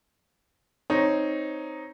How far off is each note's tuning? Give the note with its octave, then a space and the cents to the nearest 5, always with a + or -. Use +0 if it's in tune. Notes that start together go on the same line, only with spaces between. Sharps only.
C4 +0 D#4 +0 C#5 +0